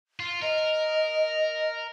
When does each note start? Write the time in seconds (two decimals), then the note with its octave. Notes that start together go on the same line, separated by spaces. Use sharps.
0.20 F4
0.42 A#4 D#5